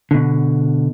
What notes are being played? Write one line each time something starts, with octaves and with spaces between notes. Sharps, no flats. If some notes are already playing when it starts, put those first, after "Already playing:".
B2 D3